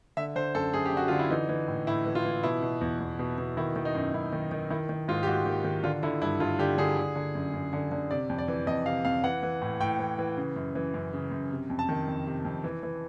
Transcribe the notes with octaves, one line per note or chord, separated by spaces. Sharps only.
D3 E5
D3 C5
F#2 A4
F#2 G#4
G4
D3 F#4
D3 F4
E4
E3 D#4
E3
A2
A2 E4
E3
F4
E3
B2 E4
B2
E2
E2
B2
B2
D#3 E4
D#3
D#4
F#2
F#2 E4
D#3
D#3
D#3 E4
D#3
G#2 F4
G4
G#2 F#4
D#3
D#3
D3 F4
D3 E4
G2 E4
G2 F4
D3 G4
D3 G#4
D3
D3
F#2
F#2
D3
D3
C3 D5
F2
D5
E3
F2 D#5
C3 F5
F2 F5
E3 F#5
E3
A2
A2 G5
E3
E3
C#3
F#2
E3
F#2
C#3
F#2
C3
F2
A5
D#3
F2
C3
F2
E3
E3